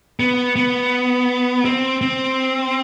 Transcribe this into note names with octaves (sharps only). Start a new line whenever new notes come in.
B3
B3
C4
C4